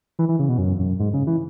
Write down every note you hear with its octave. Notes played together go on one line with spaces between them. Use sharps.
E3
E3
C#3
B2
F#2
F#2
G#2
C#3
E3